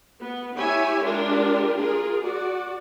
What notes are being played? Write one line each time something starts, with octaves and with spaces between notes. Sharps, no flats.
B3
E4 G4 C#5 E5 G#5
G#3 D4 F4 G4 A#4
F4 G#4 A#4
F#4 D5